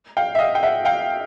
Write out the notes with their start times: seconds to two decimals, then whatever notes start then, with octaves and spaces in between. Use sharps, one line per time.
0.17 F5 G5
0.35 E5
0.39 D#5 F5
0.55 G5
0.63 E5 F#5
0.85 F5 G5